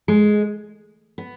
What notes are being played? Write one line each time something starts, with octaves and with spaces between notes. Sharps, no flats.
G#3
B3